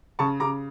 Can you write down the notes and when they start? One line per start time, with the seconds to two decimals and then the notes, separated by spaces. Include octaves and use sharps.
0.19 C#3 A5 C#6
0.40 C#3 A#5 D6